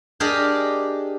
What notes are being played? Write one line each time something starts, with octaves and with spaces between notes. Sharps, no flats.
D4 G4 G#4 A#4 D5 D#5